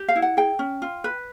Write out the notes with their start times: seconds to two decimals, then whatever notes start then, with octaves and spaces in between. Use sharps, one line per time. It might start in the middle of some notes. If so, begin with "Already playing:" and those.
Already playing: G4
0.08 F5
0.16 E4
0.22 F#5
0.37 G#4 G5
0.59 C#4
0.82 F4
1.04 B4